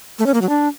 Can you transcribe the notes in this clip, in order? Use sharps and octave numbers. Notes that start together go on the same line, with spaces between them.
A3
C#4
A#3
F#3
D4